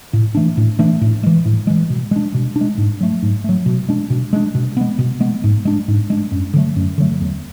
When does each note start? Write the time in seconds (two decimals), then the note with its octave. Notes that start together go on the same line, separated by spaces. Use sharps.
0.13 A2
0.35 E3 A3 D4
0.57 A2
0.79 E3 A3 D4
1.01 A2
1.23 E3 G#3
1.45 A2
1.67 E3 G#3
1.90 B2
2.11 G#3 D4
2.34 B2
2.56 D4
2.61 G#3
2.78 G#2
3.01 F#3 A3
3.23 G#2
3.44 F#3 A3
3.66 B2
3.89 G#3 D4
4.10 B2
4.33 G#3 D4
4.55 B2
4.77 G#3 B3
4.99 B2
5.21 G#3 B3
5.44 G#2
5.65 G#3 D4
5.88 G#2
6.10 G#3 D4
6.32 F#2
6.54 D3 F#3 A3
6.76 F#2
6.98 D3 F#3 A3
7.20 E2